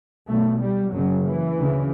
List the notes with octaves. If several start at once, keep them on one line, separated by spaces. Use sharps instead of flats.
B1 B2 A3
G3
F#1 F#2 C#3 F#3
E3
D2 C#3